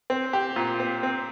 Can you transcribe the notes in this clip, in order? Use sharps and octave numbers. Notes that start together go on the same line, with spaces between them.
C4
G4
A#2
C4
C4